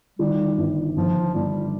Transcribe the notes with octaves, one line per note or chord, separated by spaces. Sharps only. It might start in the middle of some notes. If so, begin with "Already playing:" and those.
D#3 G3
G1
G1 F3
G1 G3